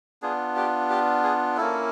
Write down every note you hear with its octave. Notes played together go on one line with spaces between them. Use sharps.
B3 D4 F4 G#4
G4
G4
G#4
A#3 C#4 E4 A4